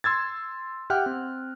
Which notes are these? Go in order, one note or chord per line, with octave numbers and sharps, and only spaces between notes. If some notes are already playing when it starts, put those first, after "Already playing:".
C6 E6 G#6 A6
G4 E5 F#5 G5 F6 F#6
C4